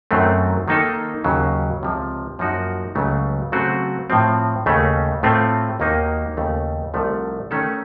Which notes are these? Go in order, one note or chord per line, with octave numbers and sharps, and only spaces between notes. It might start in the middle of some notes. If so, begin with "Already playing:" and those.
F#2 D#3 F#3 A3 C4
D#3 A#3 D#4 A4
D#2 C#3 F#3
C#2 C3 F3
F#2 F3 A#3 D#4 F#4
C#2 C#3 F#3 A3
C#3 F#3 A3 C4 F#4
A2 F3 C4
D#2 C#3 A3 C#4
A2 A3 C4 F4
D#2 D#3 A#3 D#4 F#4
D#2 C#3 A3
C2 C3 F3 A3
D#3 A3 C#4 A4